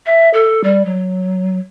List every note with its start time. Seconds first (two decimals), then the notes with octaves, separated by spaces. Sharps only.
0.06 E5
0.33 A4
0.64 G3
0.85 F#3